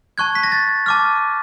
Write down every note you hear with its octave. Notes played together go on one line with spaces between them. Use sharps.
A5 C#6 F#6 G#6
B6
A#6
A6
A5 D6 F6